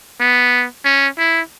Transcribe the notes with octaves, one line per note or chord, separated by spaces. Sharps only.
B3
C#4
E4